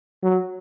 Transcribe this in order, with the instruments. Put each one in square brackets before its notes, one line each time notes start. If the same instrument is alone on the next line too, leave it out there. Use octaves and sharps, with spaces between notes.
[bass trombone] F#3